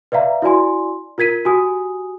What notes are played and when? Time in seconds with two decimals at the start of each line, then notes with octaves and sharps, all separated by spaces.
0.12 B4 D5 E5 F5 A#5
0.42 E4 F#4 D5 G#5 C6
1.18 F4 A#4 G#6 B6 D#7
1.45 F#4 G4 G#5 D#6